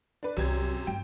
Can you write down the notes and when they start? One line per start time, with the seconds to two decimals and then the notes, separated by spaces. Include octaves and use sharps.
0.23 D4 B4
0.37 C2 F#2 C3 G#6
0.87 G2 G5